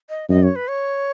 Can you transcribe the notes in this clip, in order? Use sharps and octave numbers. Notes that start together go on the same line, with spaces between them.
D#5
F#2 D#5
C#5
B4
C#5